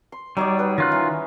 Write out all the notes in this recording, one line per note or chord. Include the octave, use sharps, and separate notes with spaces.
C6
F#3 G3 D#4 C#5 D5
D#4 B4
D#3 C#4 F4 F#6
E3